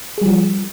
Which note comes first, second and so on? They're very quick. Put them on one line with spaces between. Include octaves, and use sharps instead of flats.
G#4 G3 F3